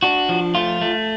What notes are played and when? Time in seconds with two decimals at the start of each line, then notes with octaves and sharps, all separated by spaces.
0.03 D4 F#4
0.29 F3
0.55 A3 F4
0.81 A3